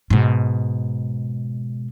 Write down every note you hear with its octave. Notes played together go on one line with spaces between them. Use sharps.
G#2 B2